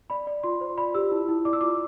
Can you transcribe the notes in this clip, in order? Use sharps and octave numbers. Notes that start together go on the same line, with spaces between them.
D5 B5
D5
F4 C6
C5
D5 B5
G4 E6
E4
E4
D5 D6
E6
F4 D6